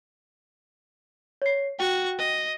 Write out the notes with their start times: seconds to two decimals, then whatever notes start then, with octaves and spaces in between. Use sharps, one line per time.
1.42 C#5 C7
1.79 F#4 G5 C#6
2.18 D#5